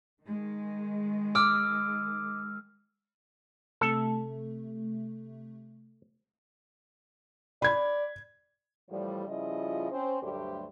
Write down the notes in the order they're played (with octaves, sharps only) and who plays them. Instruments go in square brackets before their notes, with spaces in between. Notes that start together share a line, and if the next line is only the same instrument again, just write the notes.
[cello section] D#3 G#3
[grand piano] D6 [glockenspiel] E6 F6
[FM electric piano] C3 A3 [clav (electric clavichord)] A4
[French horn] D5 [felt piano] B5 G#6
[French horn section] A2 E3 F3 G3
C#3 F3 G3 E4 F4 D#5
C4 C#4 C5
D2 G2 F#3 A3 G4 C5